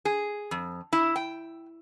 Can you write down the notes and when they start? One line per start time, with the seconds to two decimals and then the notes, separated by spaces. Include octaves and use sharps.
0.05 G#4
0.51 F2
0.93 E4
1.16 G5